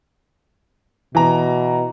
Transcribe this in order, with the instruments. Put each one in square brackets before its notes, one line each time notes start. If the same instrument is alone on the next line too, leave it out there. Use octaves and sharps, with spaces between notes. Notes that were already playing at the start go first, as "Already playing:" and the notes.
[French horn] B2 [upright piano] E3 A#5